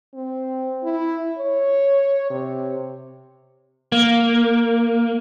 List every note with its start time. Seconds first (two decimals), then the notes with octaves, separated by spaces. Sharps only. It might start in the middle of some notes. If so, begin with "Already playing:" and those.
0.14 C4
0.83 E4
1.38 C#5
2.30 C3
3.92 A#3